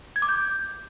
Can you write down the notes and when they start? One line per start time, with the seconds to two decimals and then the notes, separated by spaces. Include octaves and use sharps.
0.16 G#6
0.22 D6
0.29 G6